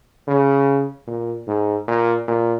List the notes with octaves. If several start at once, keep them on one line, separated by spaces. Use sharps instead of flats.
C#3
A#2
G#2
A#2
A#2